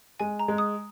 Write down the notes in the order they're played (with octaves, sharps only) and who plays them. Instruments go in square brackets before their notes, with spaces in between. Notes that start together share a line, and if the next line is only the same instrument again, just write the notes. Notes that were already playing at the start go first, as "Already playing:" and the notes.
[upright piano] G#3 [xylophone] G#5
[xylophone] A#5
[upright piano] G#3
[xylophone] D#6